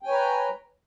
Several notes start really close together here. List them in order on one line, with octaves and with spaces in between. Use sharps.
G5 G#5 C#5 B4 A#5